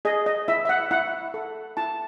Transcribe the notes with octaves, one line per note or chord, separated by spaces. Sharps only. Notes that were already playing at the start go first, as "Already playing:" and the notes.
G#4 D#5
D#5
E4 E5
E5
F#5
E4 F#5
A4
E4 A5